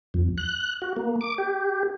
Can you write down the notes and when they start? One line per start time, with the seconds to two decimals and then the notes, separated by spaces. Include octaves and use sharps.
0.14 F2
0.38 F#6
0.82 F#4
0.96 A#3
1.21 D6
1.38 G4